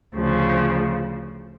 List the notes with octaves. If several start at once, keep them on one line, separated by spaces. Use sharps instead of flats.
D2 C#3 F3